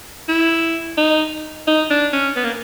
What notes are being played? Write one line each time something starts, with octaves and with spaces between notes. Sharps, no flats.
E4
D#4
D#4
D4
C#4
B3
A#3